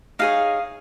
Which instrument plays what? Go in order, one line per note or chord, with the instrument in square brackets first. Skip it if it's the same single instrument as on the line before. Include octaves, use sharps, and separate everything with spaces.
[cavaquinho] D#4 G#4 C#5 F5